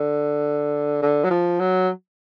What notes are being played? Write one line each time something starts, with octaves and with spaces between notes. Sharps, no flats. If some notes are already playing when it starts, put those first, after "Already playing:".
Already playing: D3
D3
F#3
F3
F#3